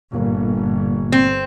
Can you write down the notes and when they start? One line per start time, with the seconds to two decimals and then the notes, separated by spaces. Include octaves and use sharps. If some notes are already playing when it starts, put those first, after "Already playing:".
0.13 G1 A#2 A#3
1.12 C4